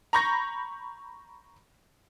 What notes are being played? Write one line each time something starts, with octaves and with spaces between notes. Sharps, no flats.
A#5 B5 C#6 G6 A#6